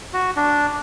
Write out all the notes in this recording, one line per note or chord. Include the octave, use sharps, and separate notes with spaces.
F#4
D4